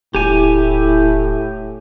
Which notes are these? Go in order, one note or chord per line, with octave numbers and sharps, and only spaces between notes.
D#1 A2 E4 G4 G#5